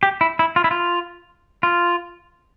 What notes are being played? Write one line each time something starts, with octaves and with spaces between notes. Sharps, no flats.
G4
E4
E4
F4
E4
F4
F4